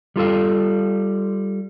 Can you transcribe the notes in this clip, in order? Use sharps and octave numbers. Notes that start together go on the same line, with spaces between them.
G3 F4 A4 F5